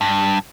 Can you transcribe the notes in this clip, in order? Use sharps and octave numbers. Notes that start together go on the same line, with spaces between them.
G2